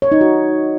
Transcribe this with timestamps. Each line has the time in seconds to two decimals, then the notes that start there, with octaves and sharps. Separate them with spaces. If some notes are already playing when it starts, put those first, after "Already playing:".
0.02 C#5
0.12 D#4
0.21 F#4